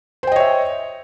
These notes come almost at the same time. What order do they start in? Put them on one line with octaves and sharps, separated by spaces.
C5 G5 D#5 C#5 E5